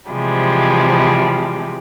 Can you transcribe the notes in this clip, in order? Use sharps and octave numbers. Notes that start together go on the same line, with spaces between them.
C3 E3 F3 G3 G#3